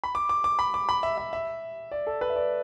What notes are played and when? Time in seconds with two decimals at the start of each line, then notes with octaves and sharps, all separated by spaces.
0.04 B5
0.15 D6
0.29 D6
0.44 D6
0.59 B5
0.74 D6
0.89 B5
1.03 E5
1.18 E5
1.33 E5
1.92 D5
2.07 A4
2.21 B4
2.30 E5
2.36 D5